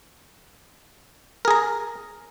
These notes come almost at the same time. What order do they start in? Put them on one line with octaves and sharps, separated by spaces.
A#4 G#4 A#5